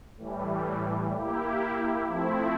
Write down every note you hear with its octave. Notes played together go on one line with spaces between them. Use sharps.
A2 E3 G3
A#3 E4 G4
F3 A3 C4 E4